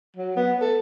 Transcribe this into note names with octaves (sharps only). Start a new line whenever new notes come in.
F#3
B3
A4